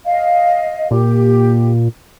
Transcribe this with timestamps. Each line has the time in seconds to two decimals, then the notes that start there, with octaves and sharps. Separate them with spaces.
0.06 D#5 F5
0.91 A#2 G4